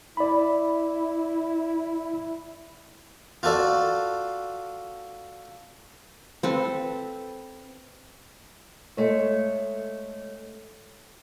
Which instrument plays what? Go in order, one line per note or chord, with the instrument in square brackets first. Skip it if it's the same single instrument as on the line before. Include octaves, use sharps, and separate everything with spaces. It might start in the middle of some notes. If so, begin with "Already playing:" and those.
[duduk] E4 [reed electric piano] D5 B5
[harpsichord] F4 F#4 A4 D5
[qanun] C4 A4 B4
[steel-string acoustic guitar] G#3 A3 C#5